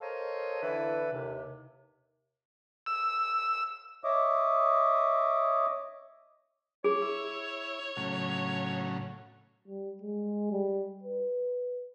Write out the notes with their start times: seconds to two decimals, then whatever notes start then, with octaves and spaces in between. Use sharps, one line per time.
0.01 A4 A#4 C5 C#5 D#5 F5
0.63 D3 E3 E4 A4 B4
1.13 D#2 C3
2.86 E6
4.04 C#5 D#5 E5 D6 D#6
6.84 G#4 C#5
7.02 E4
7.97 A2 C#3 F#3
9.68 G3
10.02 G#3
10.51 G3
11.03 B4